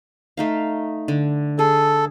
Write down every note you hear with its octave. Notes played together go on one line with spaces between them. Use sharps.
A3 D#4 F5
D3
G#4 A4